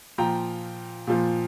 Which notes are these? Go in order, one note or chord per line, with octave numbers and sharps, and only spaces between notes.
A#2 F3 G5 A#5
A#2 F3